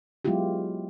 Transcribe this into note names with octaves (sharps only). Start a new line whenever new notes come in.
F#3 G#3 B3 E4 F4 G4